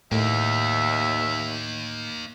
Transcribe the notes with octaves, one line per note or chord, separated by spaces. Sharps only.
D#2 A2 A#3 D#4 E5